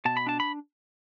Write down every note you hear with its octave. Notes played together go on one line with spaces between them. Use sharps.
B2 A5
B5
D4 A5
B5